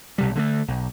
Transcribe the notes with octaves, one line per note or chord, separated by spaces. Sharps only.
B1 C3 G3
D3 G#3 A3
B1